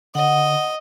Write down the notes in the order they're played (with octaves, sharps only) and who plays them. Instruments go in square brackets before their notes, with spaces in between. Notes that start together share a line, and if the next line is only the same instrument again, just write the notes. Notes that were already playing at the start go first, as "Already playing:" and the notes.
[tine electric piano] D3 [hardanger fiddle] D#5 [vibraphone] F#5